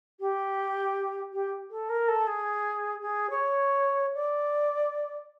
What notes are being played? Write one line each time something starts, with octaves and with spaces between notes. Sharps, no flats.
G4
G4
A4
A#4
A4
G#4
G#4
C#5
D5